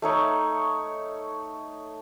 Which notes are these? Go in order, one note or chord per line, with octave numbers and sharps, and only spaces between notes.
A3 D#4 C#5